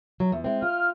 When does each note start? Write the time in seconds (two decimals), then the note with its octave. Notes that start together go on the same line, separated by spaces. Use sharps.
0.20 F#3
0.32 E2
0.44 G#3 C4
0.62 F4 F6